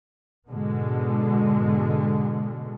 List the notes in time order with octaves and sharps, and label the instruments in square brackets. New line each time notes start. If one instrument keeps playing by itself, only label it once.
[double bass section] G#2 B2 D3 G#3